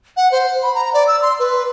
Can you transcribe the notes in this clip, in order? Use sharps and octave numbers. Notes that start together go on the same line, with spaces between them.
F#5
C5
B5
A#5
D5
E6
C6
B4